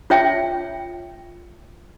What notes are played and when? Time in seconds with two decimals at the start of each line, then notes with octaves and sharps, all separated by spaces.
0.10 F4 C#5 E5 G5